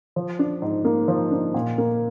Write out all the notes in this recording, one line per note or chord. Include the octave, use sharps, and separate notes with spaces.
F3
D4
G#2
A#3
F3
D4
A#2
A#3